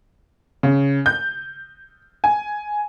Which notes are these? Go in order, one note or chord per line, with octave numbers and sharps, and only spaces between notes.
C#3
G6
G#5